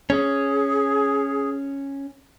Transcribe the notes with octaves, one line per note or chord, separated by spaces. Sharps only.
C#4 G#4